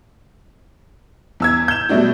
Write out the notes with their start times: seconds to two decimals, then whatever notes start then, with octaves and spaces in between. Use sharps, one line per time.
1.40 E2 E6 G#6
1.68 G6 E7
1.89 B2 F#3 G3 A3 D4 F#4